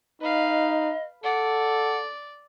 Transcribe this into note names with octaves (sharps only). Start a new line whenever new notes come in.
D#4 B4 D#5 F5
A4 D5 F#5